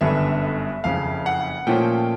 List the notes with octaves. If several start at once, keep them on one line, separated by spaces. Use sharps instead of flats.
G1 F#2 D3 G3 B3 E5
F#1 F2 C#3 F5
F#5
A#2 F3 A3 C#4 F4 G5